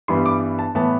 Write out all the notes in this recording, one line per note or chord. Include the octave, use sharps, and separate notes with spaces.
G2 E3 G3 B3 C6
D6
A5
A2 E3 B3 A5